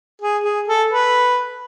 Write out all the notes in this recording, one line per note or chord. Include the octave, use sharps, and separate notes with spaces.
G#4
G#4
A4
B4